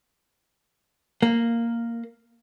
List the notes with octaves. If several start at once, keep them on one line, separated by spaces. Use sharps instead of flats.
A#3